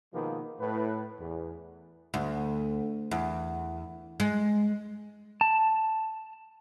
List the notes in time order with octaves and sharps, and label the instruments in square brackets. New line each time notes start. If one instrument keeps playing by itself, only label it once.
[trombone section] B2 D#3 F3 G#3 A#3 B3
A2 B4
E2
[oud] D2
E2
G#3
[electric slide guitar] A5